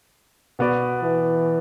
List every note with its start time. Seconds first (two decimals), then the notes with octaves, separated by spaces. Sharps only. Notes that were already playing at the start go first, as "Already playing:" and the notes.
0.59 B2 B3 F#4 B4 D5
1.03 E3